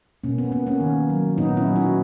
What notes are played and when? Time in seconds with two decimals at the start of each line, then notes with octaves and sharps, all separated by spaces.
0.24 B2 A#3 C#4
0.38 B3
0.52 A#3 B3
0.67 A#3 C#4
0.80 D#3
1.09 F#3
1.38 A#2 B3 D#4
1.57 C#4 E4
1.66 F#3
1.75 D#4 F#4